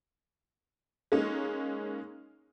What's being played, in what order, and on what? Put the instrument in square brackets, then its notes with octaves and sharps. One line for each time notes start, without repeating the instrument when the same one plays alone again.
[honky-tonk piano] G#3 A#3 C#4 D#4